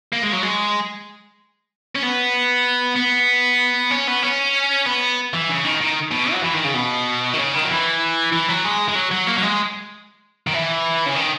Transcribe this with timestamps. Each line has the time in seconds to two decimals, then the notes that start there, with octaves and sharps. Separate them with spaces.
0.13 A#3
0.23 G#3
0.33 F#3
0.43 G#3
1.95 C#4
2.03 B3
2.96 B3
3.91 C#4
4.08 B3
4.23 C#4
4.86 B3
5.33 E3
5.49 C#3
5.64 D#3
5.81 D#3
6.11 B2
6.32 F#3
6.43 E3
6.53 D#3
6.65 C#3
6.74 B2
7.33 D#3
7.38 C#3
7.54 D#3
7.64 F#3
7.70 E3
8.32 E3
8.48 F#3
8.64 G#3
8.88 G#3
8.95 F#3
9.11 F#3
9.27 A#3
9.38 F#3
9.43 G#3
10.47 D#3
10.53 E3
11.06 C#3
11.16 D#3